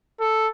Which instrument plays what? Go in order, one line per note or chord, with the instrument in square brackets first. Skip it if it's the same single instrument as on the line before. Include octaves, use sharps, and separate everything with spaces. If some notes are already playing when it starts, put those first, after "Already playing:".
[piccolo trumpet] A4